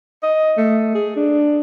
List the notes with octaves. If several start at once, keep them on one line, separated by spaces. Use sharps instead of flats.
D#5
A3
G#4
D4